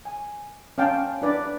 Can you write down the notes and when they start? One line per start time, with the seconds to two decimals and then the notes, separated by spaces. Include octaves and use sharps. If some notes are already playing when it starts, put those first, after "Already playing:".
0.05 G#5
0.78 C#4 F5 G5 A5
1.22 D4 E4 B4 D5